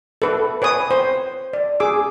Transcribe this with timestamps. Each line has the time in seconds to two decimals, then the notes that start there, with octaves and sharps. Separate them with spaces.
0.22 A4 B4
0.62 B4 C#5 G#5 D#6
0.91 C5
1.53 D5
1.80 G#4 D6 E6